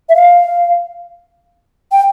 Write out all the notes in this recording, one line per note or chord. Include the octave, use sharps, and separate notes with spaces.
E5
F5
G5